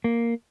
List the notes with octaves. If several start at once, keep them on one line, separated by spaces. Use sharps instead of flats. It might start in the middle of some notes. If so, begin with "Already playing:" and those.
A#3